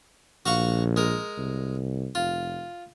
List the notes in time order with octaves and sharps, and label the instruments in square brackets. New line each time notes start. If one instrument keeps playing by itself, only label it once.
[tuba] A#1 [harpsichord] F#4 F5 C#6
[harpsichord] G#3 A#4
[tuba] C2
[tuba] F1 [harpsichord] F4